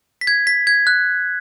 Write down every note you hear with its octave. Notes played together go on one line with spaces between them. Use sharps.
B6
G#6
B6
G#6
F#6